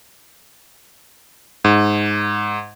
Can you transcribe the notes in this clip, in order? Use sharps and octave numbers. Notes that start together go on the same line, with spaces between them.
G#2